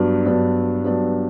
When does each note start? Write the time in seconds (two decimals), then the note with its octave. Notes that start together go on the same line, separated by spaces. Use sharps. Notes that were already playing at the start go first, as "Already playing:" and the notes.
Already playing: G2 F#3 B3 D4
0.25 G2 F#3 B3 D4
0.84 G2 F#3 B3 D4